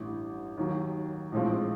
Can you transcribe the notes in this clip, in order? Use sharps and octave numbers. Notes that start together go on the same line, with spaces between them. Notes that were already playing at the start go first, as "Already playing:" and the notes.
Already playing: A1 G2 E3
D#2 D#3 F#3
A#1 A2 F3 G#3 C4